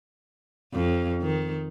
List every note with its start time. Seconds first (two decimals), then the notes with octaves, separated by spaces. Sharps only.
0.74 F2
1.22 D#3